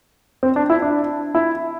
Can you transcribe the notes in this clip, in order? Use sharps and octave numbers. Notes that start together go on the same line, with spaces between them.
C4
D4
E4
D4
E4